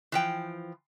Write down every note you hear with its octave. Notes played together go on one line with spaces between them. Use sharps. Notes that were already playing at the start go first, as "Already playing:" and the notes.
E3 F3 G5